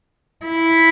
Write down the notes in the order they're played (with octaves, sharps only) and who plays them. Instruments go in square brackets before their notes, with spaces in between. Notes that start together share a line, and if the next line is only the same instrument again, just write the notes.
[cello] E4